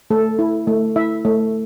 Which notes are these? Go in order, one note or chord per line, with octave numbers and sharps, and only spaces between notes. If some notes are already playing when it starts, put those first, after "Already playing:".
A3 A4
E4
A3
E4 E5
A3